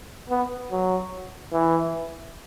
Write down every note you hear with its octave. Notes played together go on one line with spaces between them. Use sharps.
B3
F#3
E3